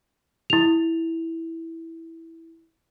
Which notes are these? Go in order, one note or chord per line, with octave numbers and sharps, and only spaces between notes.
E4 F7